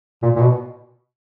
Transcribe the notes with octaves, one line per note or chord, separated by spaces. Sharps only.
A#2
A#2
B2